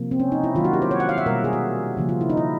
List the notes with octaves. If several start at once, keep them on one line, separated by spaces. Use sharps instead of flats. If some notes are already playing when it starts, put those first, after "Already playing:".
Already playing: C3 F3 A#3
C4
C#4
D#4
E4
D#3 F#3 A#3 F4
F#4
G4
C5
C#5
F#5
F5
E5
B2 G3 A#3 A#4
G#4
F#4
C#3 F3 A#3
F4
E4
D#4
E4